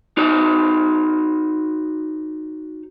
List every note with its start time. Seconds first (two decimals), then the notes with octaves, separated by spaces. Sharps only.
0.17 D#4 F#4 C5 D5